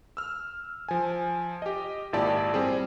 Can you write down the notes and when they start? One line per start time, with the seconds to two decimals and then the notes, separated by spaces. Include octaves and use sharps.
0.17 E6 F6
0.88 F3 G#5
1.62 G4 D#5
2.13 G#1 A#2 E4 G4 D5 A5
2.54 G3 C4 G4 G#4